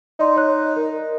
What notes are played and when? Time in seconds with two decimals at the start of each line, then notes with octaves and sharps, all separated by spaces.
0.19 D#4 D5 C6
0.36 C#5 F#6
0.76 A#4